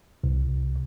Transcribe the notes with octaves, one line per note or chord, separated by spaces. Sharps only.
C2